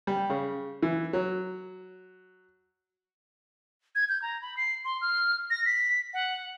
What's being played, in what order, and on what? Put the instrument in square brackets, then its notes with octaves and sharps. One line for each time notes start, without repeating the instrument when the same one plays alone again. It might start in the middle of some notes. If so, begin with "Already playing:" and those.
[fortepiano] G3
C#3
E3
F#3
[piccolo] G#6
G6
A#5
B5
C7
C6
F6
A#6
B6
F#5